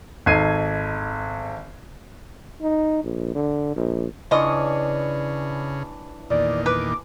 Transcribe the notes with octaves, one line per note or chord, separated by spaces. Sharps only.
G#1 D#4 A4 G#6 C7 D#7
D#4
A#1
D3
A#1
C#3 E3 D4 F4 C#5 D#5
E2 A#2 D#3 D5
B4 D6